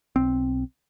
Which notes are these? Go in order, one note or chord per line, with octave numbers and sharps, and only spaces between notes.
B1 C4